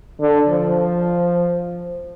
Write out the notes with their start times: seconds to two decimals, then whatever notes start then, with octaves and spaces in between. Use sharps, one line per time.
0.21 D3
0.49 F3